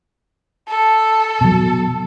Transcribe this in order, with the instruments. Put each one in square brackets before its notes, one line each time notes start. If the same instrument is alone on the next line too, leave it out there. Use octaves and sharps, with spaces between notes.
[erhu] A4
[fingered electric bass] B2 F#3